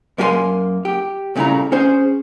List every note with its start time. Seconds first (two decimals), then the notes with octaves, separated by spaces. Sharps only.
0.18 F#2 A#3 G4 G#4 G#5 C6
0.85 G4
1.36 C2 A#2 C#3 A3 E4 A#5
1.72 C#4 G#4 C5